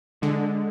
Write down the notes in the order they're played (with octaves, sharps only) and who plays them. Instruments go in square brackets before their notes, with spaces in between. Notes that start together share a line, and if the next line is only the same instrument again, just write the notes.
[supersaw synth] D3 [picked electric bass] G#3